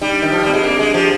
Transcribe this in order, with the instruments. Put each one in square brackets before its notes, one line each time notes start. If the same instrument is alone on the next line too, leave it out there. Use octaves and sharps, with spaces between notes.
[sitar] G3 [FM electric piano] D#4
[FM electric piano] D4
[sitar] D#3 [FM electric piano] D#4
[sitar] F3 [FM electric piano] D4
[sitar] G3
[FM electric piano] C4
[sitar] G#3
[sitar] A#3 [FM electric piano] D4
[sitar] G#3
[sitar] F3 [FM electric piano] G4